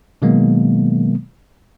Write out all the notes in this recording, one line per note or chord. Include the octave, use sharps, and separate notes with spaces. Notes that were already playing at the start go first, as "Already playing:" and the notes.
B2 D#3 F#3 G#3 A#3 B3